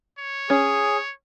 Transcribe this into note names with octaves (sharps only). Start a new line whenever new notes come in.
C#5
C#4 G#4